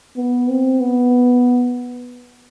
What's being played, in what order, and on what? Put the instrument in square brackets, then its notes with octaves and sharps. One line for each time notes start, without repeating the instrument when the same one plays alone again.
[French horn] B3
C4
B3